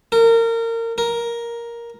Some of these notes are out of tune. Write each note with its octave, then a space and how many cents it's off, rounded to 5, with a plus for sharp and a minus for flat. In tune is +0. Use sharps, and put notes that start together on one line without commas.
A#4 -25
A#4 +10